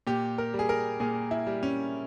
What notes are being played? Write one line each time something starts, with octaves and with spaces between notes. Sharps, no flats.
A#2 G4
A#4
G3
G#4
A#4
A#2 G#4
E4
G3
C#4